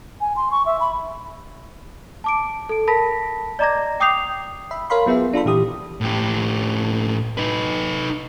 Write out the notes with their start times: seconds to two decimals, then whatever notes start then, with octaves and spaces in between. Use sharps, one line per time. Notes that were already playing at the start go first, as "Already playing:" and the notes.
0.21 G#5
0.36 C6
0.51 C#6
0.66 E5
0.80 B5
2.24 A5 D6 D7
2.69 A4 D7
2.87 A#4 A5 B5 A#6 B6
3.59 D5 D#5 A#5 D6 G#6 A#6
4.00 G5 D6 D#6 G6 C7 F7
4.71 E5 B5
4.90 A#4 C#5 F5 B5 C6
5.06 F#3 B3 F4 G#4 E5
5.33 D4 F4 A4 B5
5.45 A#2 E3 G4 D#6
6.01 A2 G4
7.38 D#4 B4